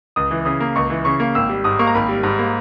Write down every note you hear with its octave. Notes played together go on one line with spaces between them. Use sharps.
C#2 D#6
E3
C#3 D#6
A#3
C#2 C#6
E3
C#3 C#6
A#3
G#1 E6
G3
G#2 D#6
A#3 C#6
A#5
G#1 B5
G3
G#2
A#3